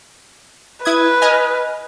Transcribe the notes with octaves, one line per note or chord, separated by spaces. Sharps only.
E4 B4 D#6 G#6
D#5 G#5 F6